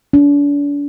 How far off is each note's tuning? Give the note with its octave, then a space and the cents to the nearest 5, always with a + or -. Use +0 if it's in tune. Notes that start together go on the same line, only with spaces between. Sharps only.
D4 -40